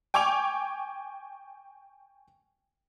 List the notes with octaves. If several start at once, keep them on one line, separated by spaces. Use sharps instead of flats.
G5 G#5 C#6 D6 F7